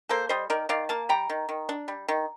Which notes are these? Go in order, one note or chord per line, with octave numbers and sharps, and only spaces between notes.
A#3 A4 C5
G3 C5 D#5
D#3 A#4 D5
D#3 D5 F5
A#3 F5 A5
G3 G5 A#5
D#3
D#3
D4
G3
D#3